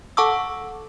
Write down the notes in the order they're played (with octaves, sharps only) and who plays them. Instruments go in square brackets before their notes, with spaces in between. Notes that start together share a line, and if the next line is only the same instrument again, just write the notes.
[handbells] A4 F#5 A5 C#6 D6 E6